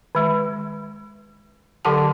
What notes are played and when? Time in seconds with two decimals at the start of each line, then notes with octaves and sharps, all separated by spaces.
0.15 D#3 G#3
1.85 D3 F#3 G4 A4 F#5 A5